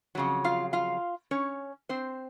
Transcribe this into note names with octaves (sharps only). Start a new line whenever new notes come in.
F2 C#3 F#3
F4 F5
F4 F5
C#4 C#5
C4 C5